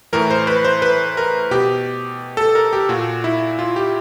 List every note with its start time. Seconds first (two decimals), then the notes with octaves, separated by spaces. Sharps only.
0.13 A2 E3 A#4
0.30 C5
0.47 B4
0.65 C5
0.82 B4
1.17 A#4
1.51 B2 G4
2.37 A4
2.55 A#4
2.73 G4
2.89 A#2 F#4
3.24 E4
3.59 F4
3.76 G4